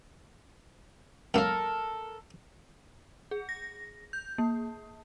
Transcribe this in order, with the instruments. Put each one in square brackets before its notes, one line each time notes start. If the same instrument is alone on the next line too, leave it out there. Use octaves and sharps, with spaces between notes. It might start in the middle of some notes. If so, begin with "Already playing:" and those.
[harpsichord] F#2 A#3 [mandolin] A4 A#4
[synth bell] G#4
A#6
G6
A#3